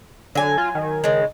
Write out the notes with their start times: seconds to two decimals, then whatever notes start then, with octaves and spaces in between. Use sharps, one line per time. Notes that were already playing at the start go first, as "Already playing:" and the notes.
0.35 D3 F#3 G#5
0.58 F4
0.75 D#3
1.04 C#3 G#3